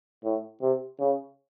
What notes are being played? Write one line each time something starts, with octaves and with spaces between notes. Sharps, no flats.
A2
C3
C#3